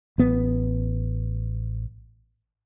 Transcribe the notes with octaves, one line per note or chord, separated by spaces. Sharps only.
A1 B3